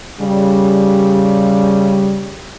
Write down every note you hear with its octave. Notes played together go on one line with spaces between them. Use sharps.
C#3 G3